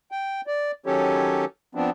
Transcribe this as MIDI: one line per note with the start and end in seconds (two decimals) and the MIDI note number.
0.11 0.41 79
0.47 0.71 74
0.86 1.45 51
0.86 1.45 54
0.86 1.45 61
0.86 1.45 67
0.86 1.45 69
0.86 1.45 73
1.75 1.90 53
1.75 1.90 59
1.75 1.90 60
1.75 1.90 62